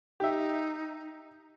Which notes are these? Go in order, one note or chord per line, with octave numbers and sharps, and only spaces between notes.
D#4 G4 E5